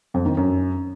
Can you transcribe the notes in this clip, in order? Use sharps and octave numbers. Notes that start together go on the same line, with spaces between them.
F2
D#3
F#2